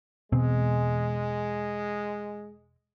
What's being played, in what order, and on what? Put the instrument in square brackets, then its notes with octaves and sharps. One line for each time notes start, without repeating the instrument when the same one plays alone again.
[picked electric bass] E1 B2 C4 [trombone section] G#3